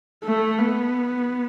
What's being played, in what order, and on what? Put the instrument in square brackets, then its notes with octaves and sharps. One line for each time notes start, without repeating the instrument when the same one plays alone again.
[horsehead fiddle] A3
B3